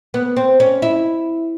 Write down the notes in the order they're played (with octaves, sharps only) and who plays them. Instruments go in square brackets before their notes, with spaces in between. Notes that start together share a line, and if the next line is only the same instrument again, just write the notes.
[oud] B3
C4
C#4
E4